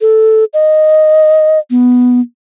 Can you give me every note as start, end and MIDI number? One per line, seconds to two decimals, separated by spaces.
0.01 0.45 69
0.53 1.59 75
1.70 2.20 59